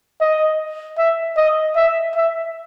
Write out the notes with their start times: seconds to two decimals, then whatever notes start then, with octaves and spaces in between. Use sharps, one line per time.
0.21 D#5
0.98 E5
1.37 D#5
1.76 E5
2.15 E5